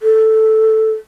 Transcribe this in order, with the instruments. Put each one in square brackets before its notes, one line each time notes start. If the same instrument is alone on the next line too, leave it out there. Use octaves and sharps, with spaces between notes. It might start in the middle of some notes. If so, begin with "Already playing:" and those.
[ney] A4